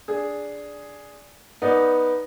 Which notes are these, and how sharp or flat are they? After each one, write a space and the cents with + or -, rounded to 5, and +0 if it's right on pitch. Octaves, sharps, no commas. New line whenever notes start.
D4 -10 G#4 +0
B3 -10 D#4 +0 D5 +0